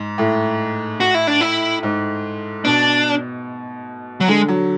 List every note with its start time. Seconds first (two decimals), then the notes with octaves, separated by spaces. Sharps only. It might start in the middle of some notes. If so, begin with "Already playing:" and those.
Already playing: G#2
0.18 A2
1.00 F#4
1.14 E4
1.27 D4
1.41 E4
1.83 G#2
2.64 B2 D4
4.20 F#3
4.28 D3 G#3
4.48 F#3